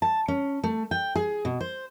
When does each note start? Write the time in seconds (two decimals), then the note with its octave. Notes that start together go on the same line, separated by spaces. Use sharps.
0.02 A5
0.28 C#4
0.64 A3
0.91 G5
1.15 G#4
1.45 B2
1.61 C5